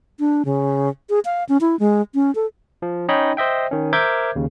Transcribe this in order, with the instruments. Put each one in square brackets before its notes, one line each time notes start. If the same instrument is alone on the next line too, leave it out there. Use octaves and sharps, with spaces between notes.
[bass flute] D4
C#3
G#4
F5
C#4
E4
G#3
C#4
A4
[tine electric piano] F3
C#4 D#4 C#5 D#5 G5 B5
C5 D#5 E5 G5
D#3 C#4
A#4 C5 E5 D6 G6 G#6
D#2 C#3